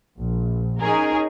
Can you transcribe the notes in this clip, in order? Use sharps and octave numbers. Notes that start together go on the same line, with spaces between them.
A#1
C#4 D#4 G#4 A#4